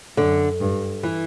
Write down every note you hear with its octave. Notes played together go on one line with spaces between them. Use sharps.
F#2 D3
G2
E3